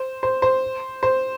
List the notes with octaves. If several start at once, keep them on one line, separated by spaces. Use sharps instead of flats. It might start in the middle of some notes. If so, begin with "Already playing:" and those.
Already playing: C5
C5
C5
C5